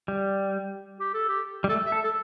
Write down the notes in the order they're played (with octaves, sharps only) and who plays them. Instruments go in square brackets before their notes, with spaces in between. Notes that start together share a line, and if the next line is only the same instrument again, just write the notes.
[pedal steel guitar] G3
[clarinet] G4
A4
G4
[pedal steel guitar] G3
[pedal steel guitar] A3 [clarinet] A4
[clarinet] E5
[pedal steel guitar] A4
[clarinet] A4